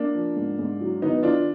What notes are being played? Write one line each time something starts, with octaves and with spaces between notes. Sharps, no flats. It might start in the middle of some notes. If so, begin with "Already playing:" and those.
Already playing: A#3 D4
F3
G#2
G#2
F#3
D#3 B3 D#4
D#3 D4 F4